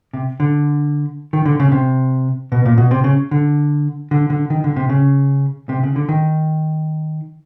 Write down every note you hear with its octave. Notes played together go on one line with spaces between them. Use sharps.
C3
D3
D#3
D3
C#3
C3
B2
A#2
B2
C3
C#3
D3
D3
D3
D#3
D3
C3
C#3
C3
C#3
D3
D#3